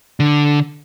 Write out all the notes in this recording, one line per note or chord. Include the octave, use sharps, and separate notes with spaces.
D3